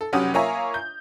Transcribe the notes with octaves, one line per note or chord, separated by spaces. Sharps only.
A4
F1 F#3 C#4 G4 F#5 D#6
A#3 F4 C#5 E5 G#5 A#5
G6